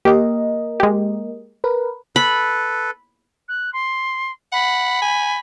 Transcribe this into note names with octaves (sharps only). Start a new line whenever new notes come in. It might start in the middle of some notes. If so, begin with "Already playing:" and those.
A#3 G4 A#4 D#5
G#3 G4
A#4 B4
A4 B4 B5
F#6
C6
F#5 B5
G#5